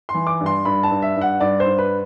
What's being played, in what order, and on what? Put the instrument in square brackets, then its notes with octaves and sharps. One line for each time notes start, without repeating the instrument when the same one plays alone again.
[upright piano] C6
E3
D6
G2
C6
G2 B5
A5
G2
E5
G2
F#5
G2 D5
C5
G2
B4